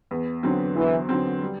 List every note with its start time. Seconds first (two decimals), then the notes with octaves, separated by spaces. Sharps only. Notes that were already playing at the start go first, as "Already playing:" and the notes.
0.11 E2
0.43 D3 F#3 C4
0.76 E2 E3
1.09 D3 F#3 C4
1.42 G3